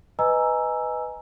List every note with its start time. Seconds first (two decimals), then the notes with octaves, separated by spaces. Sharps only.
0.19 B4 D#5 G#5 A#5 E6